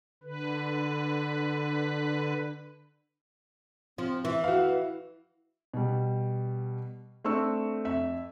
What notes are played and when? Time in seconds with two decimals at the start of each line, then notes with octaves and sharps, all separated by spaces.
0.23 D3 B4
3.98 F3 C4
4.25 E3
4.44 F#4 B4 F5
5.74 B2 G3
7.24 A3 C4 D4 C#6 E6
7.85 F2 E5